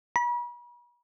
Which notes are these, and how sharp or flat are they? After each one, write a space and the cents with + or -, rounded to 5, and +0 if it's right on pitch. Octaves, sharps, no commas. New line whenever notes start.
B5 -45